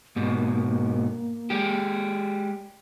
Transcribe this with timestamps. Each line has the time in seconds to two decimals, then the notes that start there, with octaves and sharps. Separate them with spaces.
0.16 G#2 B2 A#3
1.50 G#3 G4